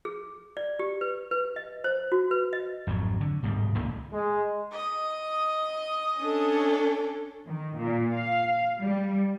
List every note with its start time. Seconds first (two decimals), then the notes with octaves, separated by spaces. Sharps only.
0.05 G#4
0.57 D5
0.79 G4
1.01 B4
1.31 B4
1.56 D#5
1.84 C5
2.12 F#4
2.31 B4
2.53 D#5
2.87 G#1 F2 F3 F#3
3.21 D3
3.43 D1 G#2 B2 G3
3.75 C#2 A#2 C#3 E3
4.13 G#3
4.72 D#5 D#6
6.20 C#4 D4 A4
7.46 D#3
7.76 A#2
8.13 F5
8.80 G3